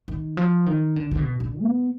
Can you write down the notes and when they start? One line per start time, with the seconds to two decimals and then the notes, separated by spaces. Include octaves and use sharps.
0.08 D#3
0.37 F3
0.66 D#3
0.96 D3
1.11 D3
1.19 B2
1.40 D3
1.62 B3